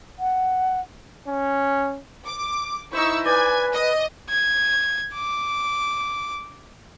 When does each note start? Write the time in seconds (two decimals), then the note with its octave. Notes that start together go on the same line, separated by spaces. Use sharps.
0.19 F#5
1.28 C#4
2.27 D6
2.93 D#4 E4 C5 C#6 E6
3.25 B4 D5 G#5 G#6
3.73 D#5
4.29 G#6
5.15 D6